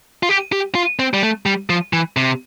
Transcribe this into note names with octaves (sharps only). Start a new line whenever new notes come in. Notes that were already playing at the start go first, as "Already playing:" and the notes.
F4
G4
G4
F4
C4
G3
A3
G3
F3
E3
C3